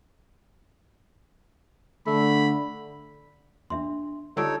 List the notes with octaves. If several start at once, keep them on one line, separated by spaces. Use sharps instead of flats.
D3 A3 B5
E2 A#2 D4 E5 C6
D3 G3 D#4 F4 A4 C#5 E6 D7